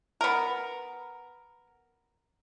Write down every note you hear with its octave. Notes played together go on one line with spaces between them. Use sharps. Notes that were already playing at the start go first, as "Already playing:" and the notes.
B3 A#4